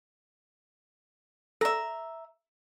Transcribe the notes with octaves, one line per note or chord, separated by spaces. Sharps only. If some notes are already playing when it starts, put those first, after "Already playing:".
A4 D5 E5 A#5